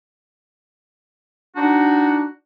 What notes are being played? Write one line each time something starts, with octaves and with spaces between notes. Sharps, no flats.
D4 D#4 F#4